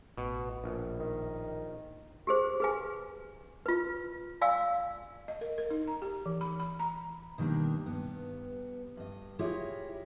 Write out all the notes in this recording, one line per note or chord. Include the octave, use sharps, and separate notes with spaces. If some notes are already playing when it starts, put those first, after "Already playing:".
A1 B2
A#1
D#3
G4 G#4 C5
G#4 B4 G#5
F4 B4
D5 F5 G#5 E6
D#5
A#4
A#4
D#4
A#5
G4
E3
B5
B5
A#5
B2 D#3 G3 A#3 D4
G2 B3
G2 D#5
E4 F4 G4 G#4 C#5 D#5